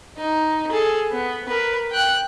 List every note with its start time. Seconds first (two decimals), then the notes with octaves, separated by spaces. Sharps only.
0.17 D#4
0.71 G#4 A4
1.11 B3
1.48 A#4 B4
1.91 G5 F#6